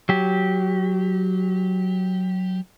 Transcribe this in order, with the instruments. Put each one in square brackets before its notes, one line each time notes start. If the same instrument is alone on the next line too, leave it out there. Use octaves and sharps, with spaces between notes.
[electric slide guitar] F#3 G4